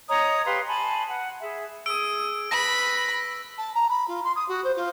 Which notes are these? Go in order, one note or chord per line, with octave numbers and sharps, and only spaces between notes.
C#5 D#5 A#5 D#6
G4 B4 F5 C6
G#5 A5 B5 C6
F#5
G#4 E5
G#4 D#6 E6 D7
B4 B5 A#6
A5
A#5
B5
F4
C6
D#6
F#4
C5
F4